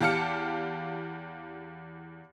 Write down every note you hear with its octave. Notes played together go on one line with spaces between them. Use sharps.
E2 G4 F5 A5 F6 C#7